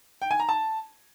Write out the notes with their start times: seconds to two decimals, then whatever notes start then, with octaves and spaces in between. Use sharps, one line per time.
0.22 G5
0.31 G#5
0.40 A#5
0.49 A5